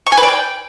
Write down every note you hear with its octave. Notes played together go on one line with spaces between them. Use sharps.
C#6
G#5
B4
D5
G5